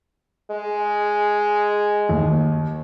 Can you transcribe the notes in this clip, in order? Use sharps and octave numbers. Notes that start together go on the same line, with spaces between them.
G#3
D#2